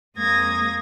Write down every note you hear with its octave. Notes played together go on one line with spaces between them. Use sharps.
F2 G#3 A#3 D#6 G#6 A#6